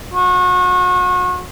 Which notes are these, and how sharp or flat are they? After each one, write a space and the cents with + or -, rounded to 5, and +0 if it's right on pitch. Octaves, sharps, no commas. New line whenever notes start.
F#4 -35